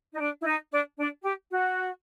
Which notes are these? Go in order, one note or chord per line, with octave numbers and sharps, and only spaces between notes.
D#4
D4
E4
D#4
D4
D4
G4
F#4